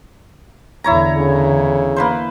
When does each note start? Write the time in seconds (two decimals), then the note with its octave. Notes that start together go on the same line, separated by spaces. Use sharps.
0.84 E2 D3 E4 C#5 A#5
1.17 C#3
1.96 A#3 B4 C5